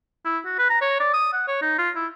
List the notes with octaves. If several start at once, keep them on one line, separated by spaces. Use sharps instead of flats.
E4
F#4
B4
A#5
C#5
D5
D#6
F#5
C#5
D#4
F4
E4